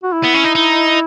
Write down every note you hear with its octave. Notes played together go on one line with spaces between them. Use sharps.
F#4
E4
B3
C#4
D#4
D#4